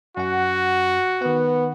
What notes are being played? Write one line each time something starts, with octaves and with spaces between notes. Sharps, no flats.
F#2 F#4 F#5
D#3 B3 F#5